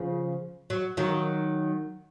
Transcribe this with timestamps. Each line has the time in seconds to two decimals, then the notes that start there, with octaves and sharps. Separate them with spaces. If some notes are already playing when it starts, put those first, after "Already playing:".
Already playing: C#3 F3
0.70 F#3
0.97 D#3 F#3